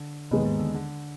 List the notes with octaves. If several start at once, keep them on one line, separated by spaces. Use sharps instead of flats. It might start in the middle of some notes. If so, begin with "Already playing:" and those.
Already playing: D3
D#2 B2 D#3 G#3 B3 D#4
G#2
D3
D3